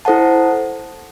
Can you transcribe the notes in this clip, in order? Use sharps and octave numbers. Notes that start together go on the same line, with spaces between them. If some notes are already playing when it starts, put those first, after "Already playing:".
E4 A4 C5 F#5 A5